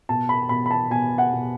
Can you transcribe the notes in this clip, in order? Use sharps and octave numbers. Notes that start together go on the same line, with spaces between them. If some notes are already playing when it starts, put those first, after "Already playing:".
B2 A5
B5
B2 B5
B5
A5
B2 G#5
F#5
B2